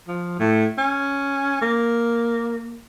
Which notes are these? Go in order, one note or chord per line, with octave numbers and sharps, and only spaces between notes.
F3
A2
C#4
A#3